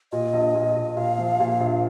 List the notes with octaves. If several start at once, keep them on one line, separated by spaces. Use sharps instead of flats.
A#2 D#5
A#1
A#2
A#2
A#2 F5
F3
A#2
A#1